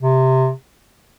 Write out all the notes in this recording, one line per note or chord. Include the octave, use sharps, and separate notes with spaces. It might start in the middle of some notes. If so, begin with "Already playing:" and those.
C3